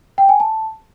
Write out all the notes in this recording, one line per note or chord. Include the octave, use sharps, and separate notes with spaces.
G5
G#5
A5